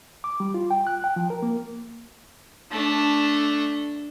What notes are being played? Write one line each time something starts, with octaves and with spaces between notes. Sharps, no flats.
D6
G3
F4
G5
F#6
G5
F3
A#4
A#3
A3 D4